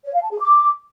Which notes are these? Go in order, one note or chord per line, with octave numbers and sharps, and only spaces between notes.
C#5
F5
A5
G#4
D6